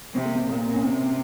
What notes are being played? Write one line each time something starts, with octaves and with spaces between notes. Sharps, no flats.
C3 C4
A#3
C4
A#2 A#3
C#4
C3 C4